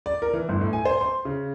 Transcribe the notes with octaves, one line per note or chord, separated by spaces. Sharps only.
D5
A#4
E3
G1
A2
G#5
C5
C6
C#3